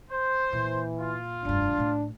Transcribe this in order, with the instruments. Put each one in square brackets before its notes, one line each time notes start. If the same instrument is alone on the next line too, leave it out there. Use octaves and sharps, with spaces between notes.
[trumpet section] C5
[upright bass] A#2 [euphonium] E3
[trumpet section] F4
[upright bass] F1 G2 [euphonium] D4
[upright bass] A2 A3